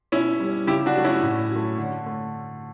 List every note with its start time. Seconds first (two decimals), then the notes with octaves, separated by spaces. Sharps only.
0.12 B2 C#4 E4
0.40 G3
0.67 C#3 E4 G4
0.86 D4 F#4
0.96 F#3 A3
1.04 C#4 E4
1.23 A2
1.50 F#3
1.56 A3
1.78 D3
2.06 A3